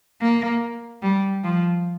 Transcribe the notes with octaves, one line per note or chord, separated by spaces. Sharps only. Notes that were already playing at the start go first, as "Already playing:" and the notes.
A#3
G3
F3